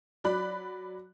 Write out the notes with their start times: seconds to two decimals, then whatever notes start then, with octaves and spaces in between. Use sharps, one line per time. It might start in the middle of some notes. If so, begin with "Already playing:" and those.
0.24 F#3 D5 B5 F#6